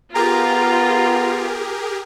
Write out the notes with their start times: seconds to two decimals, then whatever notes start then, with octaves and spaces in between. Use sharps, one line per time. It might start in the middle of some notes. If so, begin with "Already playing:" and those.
0.15 B3 F4 G4 G#4 A#4 A#5